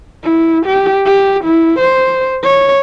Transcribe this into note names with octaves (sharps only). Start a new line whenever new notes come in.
E4
G4
G4
E4
C5
C#5